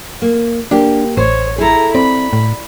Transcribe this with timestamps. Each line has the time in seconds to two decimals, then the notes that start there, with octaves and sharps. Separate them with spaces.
0.22 A#3
0.71 A#3 D4 G4
1.17 A1 C5 C#5
1.58 E4 G#4 A4 A#5
1.95 C4 D5 B5
2.33 A2